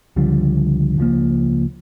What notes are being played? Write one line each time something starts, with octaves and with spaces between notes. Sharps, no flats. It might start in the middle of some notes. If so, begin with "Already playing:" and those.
C#2 D3 F3 G3
C#2 F3 A#3